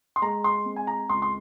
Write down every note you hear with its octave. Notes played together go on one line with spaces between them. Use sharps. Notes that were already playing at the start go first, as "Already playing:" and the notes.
C6
G#3 A#5
C6
C4
G#5
A#5
C#2 C6
C6